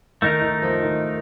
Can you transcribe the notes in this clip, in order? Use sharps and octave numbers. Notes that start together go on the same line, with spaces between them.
D#3 A3 D#4 A#4
D#3
F3
D#3